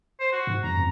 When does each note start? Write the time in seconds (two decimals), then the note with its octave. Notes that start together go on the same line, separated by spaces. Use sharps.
0.20 C5
0.32 F#4
0.47 G#2
0.64 F#2 A#5
0.77 F2